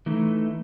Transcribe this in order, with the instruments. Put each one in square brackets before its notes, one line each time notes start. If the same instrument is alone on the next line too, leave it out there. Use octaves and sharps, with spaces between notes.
[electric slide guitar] E3 A3 D#4